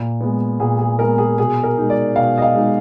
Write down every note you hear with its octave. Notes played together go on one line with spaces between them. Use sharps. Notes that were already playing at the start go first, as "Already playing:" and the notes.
Already playing: A#2
G#3 B3
A#2 G#4
G#4
G#3 B3 A#4
G#4
B2 G#4
A#4
G#3 D#4
D5
B2 F5
D#5
F5
G#3 D#4